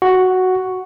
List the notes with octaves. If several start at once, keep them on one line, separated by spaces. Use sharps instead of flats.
F#4